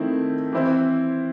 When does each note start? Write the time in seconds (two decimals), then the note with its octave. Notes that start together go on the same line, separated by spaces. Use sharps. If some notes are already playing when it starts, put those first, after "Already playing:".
Already playing: D#3 A3 C4 E4
0.53 E3 C4 E4 C5